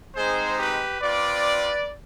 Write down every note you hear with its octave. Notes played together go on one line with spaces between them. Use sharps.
G#3 C4 D#4 G#4 C5
G4 B4
C4 F4 B4 D5